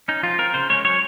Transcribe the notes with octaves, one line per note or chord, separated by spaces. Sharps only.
C#4 D#4
F3 F4
C4 A#4
C#3 C5
G#3 C#4 C#5
F#3 C#5